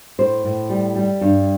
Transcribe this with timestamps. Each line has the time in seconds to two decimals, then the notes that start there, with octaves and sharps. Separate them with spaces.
0.18 A2 C5
0.45 A2
0.70 G3
0.96 G3
1.21 G2